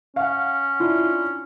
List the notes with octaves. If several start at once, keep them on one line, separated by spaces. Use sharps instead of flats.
C#4 F5 F#5
D4 E4 F4